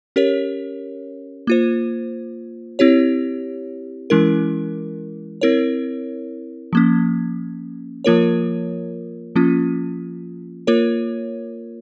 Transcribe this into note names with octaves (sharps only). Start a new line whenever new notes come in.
C#4 G4 A#4 C#5
A#3 F4 C5
C4 E4 G4 C#5
E3 G#3 C#4 E4 A#4
C4 E4 A#4 C#5
F3 A#3 C#4
F3 A#3 F4 A#4 C#5
F3 A#3 C#4 F4
A#3 F4 A#4 C#5